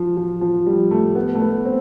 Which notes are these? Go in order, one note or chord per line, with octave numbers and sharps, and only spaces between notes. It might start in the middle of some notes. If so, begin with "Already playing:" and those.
Already playing: F3
F3
F3
G3
A3
B3
A3
B3
C4